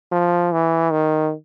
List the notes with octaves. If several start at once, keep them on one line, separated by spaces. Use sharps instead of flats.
F3
E3
D#3